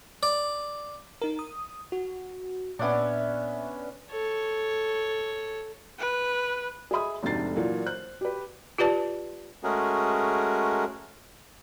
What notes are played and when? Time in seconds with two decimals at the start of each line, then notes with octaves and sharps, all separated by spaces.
0.23 D5
1.22 D#4 A#4
1.39 D#6
1.92 F#4
2.79 A#2 B3 C#4 D4 E5
4.11 A4 C#5
5.99 B4
6.91 G#4 D#5 E5 B5 D#6
7.23 F1 D2 G#2 C3 A6 C7
7.56 A#2 E3 F#3 A#3 D4
7.86 C5 F#6
8.21 G4 B4
8.78 F4 G4 B4 D5 A5
9.63 G#3 A3 C#4 F#4 G#4 A#4